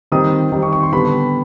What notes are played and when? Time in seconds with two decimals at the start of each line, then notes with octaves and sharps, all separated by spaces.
0.12 D#3 G3 C4 D#6
0.52 D#3 G3 C4
0.62 C#6
0.73 C#6
0.83 C6
0.92 D3 G3 B3 B5